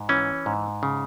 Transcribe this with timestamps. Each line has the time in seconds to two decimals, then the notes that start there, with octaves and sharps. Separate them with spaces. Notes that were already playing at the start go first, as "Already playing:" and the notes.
Already playing: G#2
0.09 E3 C#4
0.46 G#2
0.83 C#3